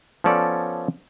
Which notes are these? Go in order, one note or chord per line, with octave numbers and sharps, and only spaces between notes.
F3 B3 C#4 A4 C#5 D5